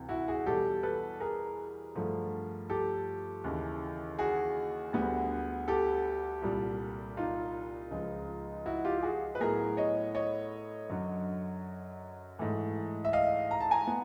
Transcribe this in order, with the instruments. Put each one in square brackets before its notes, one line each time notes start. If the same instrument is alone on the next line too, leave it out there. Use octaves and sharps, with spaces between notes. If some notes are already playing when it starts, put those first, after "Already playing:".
Already playing: [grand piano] D2 C3 E3
E4 F#4
F#4 G#4
E2 B2 G3 G4 A4
A4 B4
G#4 A#4
G2 D3 F3 A3
G4 A4
D#2 C#3 E3
F#4 G#4
D2 D3 G3 B3
G4 A4
C2 A#2 G3
D#4 F4
C#2 C#3 F3 G#3
E4 F#4
F4 G4
G4
F#4 G#4
B4
A2 F#3 B3 G#4 A#4
C#5 D#5
C#5 D#5
F#2 D3 F#3
G#2 E3 A3
E5
D#5 F5
A#5
A5
G#5 A#5
B3